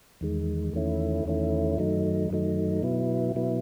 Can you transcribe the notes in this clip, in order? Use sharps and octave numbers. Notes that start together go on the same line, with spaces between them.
E2 D#3 G#3
E2 D#3 A3 C#4 E4
E2 D#3 A3 C#4 E4
F#2 D#3 F#3 A3 D#4
F#2 D#3 F#3 A3 D#4
B2 F#3 B3 E4
B2 F#3 B3 E4